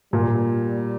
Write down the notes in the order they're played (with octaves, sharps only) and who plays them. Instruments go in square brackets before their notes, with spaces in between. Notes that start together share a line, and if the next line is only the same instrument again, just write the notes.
[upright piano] A#2 [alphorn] G3